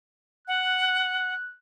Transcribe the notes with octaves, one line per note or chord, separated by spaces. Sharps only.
F#5 F#6